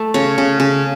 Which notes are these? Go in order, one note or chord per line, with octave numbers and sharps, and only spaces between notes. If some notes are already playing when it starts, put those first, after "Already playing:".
Already playing: A3
C#3 C#5
C#3
C#3